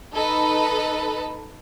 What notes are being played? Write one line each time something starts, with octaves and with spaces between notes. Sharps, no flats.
D#4 A4 B4